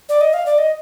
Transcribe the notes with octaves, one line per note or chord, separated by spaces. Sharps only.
D5
D#5
F5
D5
D#5